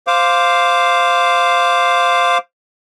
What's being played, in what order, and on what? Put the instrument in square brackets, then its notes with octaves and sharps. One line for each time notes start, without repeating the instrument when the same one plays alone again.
[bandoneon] C5 F5 D6